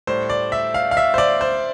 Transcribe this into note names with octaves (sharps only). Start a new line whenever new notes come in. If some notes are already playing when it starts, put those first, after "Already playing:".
A2 G3 C5
D5
E5
F5
F5
E5
C5
D5
C5